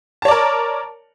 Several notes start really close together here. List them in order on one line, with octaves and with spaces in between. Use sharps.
A5 C#5 D5 A#4